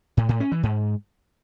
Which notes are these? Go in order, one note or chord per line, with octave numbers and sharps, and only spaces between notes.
A2
A2
C#4
E3
G#2